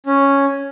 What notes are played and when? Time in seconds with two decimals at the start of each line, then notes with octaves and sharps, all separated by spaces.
0.06 C#4